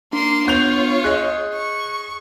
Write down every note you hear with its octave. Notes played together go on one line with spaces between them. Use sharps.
A#3 D4 C6
B3 F4 C#5 G6 F7
G#4 D#5 F#6
C#6